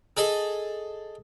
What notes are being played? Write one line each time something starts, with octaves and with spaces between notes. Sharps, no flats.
G#4 A4 D#5